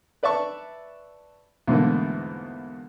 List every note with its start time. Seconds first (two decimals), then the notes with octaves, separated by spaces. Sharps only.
0.23 B4 D5 E5 A5 C#6
1.68 E2 G#2 B2 D3 A3 A#3